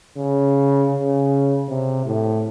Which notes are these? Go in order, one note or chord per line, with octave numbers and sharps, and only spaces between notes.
C#3
C#3
C3
A2